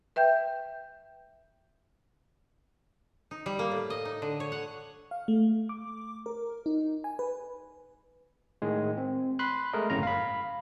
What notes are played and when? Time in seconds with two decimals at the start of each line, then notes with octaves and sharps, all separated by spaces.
0.16 B4 E5 G5 G6
3.31 D#4
3.46 G3
3.59 A#3
3.72 A2
3.90 D#5
4.05 D#4
4.22 D3
4.40 C#5
4.52 F#5
5.11 F5
5.28 A3
5.69 D6
6.26 A#4
6.66 D#4
7.04 G#5
7.19 B4
8.62 A2 D#3 G#3
8.98 C4
9.39 B5 C6 F#6
9.73 G#3 A3 A#4 D#5
9.90 G1 F#2 A2 C#3 A#5
10.03 F5 B5